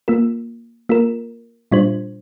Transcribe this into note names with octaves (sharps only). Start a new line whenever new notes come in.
A#3 F4 A#4
A#3 F4 A#4
A#2 G3 D4 F4 C5